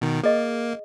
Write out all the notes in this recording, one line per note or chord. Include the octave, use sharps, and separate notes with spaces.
B2 D#3
A#3 G#4 D#5